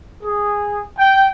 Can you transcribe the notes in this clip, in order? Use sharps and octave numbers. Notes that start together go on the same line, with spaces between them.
G#4
G5